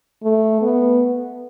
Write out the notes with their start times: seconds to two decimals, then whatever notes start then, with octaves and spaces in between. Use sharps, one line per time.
0.23 A3
0.62 B3